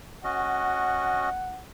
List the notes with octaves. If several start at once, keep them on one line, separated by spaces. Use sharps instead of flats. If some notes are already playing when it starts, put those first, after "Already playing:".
C#4 F#4 D#5 F#5